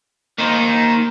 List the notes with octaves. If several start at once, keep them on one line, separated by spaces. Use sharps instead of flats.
D#3 A#3 D#4 C5